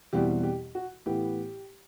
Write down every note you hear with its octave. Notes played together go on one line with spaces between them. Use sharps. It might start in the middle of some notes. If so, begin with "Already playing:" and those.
E2 B2 G3 C4 E4 G4
G4
F#4
A2 E3 B3 E4 G4